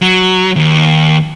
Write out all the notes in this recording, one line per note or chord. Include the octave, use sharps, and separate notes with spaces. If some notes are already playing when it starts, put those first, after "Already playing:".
F#3
D#2